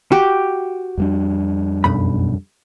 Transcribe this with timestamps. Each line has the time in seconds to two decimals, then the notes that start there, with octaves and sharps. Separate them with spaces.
0.12 F#4 G4
0.98 F2 G3 D4
1.84 B1 F#2 B5